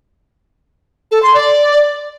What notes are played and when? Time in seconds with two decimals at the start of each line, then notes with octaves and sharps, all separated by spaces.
1.11 A4
1.23 C6
1.34 D5